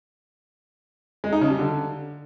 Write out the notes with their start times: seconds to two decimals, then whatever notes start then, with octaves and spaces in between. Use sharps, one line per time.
1.24 G#3
1.33 D#4
1.41 C#3
1.50 G3
1.59 D3